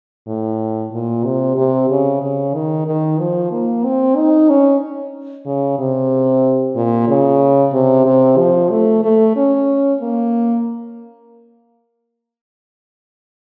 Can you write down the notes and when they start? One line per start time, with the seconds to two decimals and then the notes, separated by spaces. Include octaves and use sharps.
0.27 A2
0.92 A#2
1.24 C3
1.57 C3
1.89 C#3
2.22 C#3
2.54 D#3
2.87 D#3
3.19 F3
3.52 A#3
3.85 C4
4.17 D#4
4.49 C#4
5.46 C#3
5.79 C3
6.75 A#2
7.09 C#3
7.73 C3
8.06 C3
8.38 F3
8.70 A3
9.04 A3
9.36 C#4
10.01 A#3